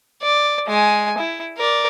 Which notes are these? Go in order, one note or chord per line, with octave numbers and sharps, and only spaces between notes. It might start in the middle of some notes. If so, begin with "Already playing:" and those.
D5
G#3 G#5
E4
A#4 D5